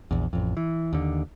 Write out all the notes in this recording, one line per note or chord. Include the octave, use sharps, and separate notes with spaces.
A#1 E2
A1 F2
E3
D#2 D3